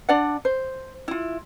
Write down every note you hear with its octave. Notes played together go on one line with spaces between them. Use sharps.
D4 D5 F#5
C5
E4 F4